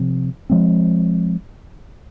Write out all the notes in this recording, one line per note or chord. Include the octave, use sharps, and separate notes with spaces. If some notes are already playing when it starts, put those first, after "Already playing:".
Already playing: C3 F3 C4
F3 G#3 C4